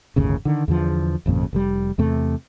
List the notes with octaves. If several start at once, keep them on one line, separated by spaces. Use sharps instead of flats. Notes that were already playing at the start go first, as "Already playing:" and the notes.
G1 D#2 A2 C#3
D3 D#3
E2 D3 F3
G#1 F2 A#2 C#3
F1 C3 G3
E2 C3 A3